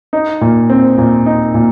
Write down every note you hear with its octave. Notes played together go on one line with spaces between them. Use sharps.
D#4
A#2
C4
A#2
D#4
A#2